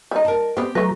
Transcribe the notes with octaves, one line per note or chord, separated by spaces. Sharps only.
G3 D#4
A#4 A5
B3 C4 G4
F#3 A3 B4 A#5